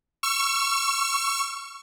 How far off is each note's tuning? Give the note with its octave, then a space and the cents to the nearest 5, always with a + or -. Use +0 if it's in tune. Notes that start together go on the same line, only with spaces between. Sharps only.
C#6 +0 E6 +40